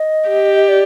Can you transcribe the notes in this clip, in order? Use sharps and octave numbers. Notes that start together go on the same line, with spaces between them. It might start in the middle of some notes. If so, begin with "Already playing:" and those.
Already playing: D#5
G4
D5